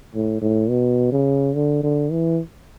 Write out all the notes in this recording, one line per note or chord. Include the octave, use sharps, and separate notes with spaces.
A2
A2
B2
C#3
D3
D3
E3